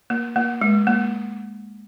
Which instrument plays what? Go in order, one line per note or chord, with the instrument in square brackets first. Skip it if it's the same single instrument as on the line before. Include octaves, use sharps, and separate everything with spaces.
[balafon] A#3
A#3
G#3
A#3